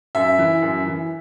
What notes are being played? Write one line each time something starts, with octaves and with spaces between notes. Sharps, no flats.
F#2 E5
E3
F#2
E3